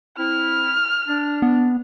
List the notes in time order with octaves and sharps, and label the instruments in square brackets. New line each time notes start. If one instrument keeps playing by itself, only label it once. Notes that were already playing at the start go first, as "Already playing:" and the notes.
[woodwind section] C4 E4 [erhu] F6
[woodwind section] D4
[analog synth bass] B3